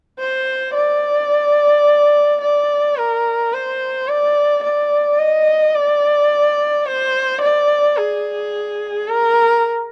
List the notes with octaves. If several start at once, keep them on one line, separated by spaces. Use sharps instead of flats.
C5
D5
D5
A#4
C5
D5
D5
D#5
D5
C5
D5
G#4
A#4